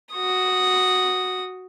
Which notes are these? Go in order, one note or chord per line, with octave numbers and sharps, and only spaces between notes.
F#4 D#6